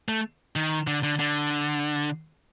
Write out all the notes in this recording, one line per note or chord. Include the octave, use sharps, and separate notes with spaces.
A3
D#3
D3
D3
D3